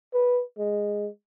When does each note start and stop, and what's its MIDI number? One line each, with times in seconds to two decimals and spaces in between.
0.14 0.42 71
0.58 1.08 56